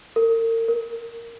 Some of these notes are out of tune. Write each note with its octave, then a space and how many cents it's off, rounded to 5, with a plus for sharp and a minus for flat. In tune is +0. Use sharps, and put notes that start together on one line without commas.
A#4 -40
A#4 -5